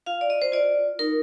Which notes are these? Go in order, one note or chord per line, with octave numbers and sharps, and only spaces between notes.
F4 F5
D5
D#5
C5
F4 D5
D#4 A#4